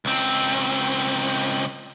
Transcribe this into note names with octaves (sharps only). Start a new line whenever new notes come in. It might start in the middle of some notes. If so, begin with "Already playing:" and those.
C#2 C4